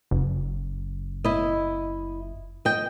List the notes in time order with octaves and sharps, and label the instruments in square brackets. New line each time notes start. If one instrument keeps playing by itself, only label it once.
[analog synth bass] F#1
[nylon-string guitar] E4 D#5
D#5 G5